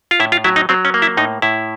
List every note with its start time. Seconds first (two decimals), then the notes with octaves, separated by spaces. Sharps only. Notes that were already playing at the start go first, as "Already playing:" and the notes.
0.11 F4
0.20 A2 E4
0.32 F4
0.44 F#3 E4
0.56 D#4
0.69 F#3 C4
0.85 C#4
0.94 A#3
1.02 E4
1.17 A2 D#4
1.42 A2 E4